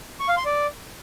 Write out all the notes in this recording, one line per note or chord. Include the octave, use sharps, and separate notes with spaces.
C#6
F5
C6
D5